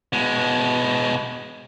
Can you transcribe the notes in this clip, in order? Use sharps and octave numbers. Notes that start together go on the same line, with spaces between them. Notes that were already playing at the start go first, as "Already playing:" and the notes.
B2 G#3